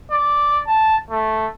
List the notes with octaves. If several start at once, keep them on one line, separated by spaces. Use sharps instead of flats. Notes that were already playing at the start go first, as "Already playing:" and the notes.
D5
A5
A3